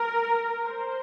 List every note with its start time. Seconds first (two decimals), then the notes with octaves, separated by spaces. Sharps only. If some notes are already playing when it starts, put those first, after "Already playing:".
Already playing: A#4
0.66 C5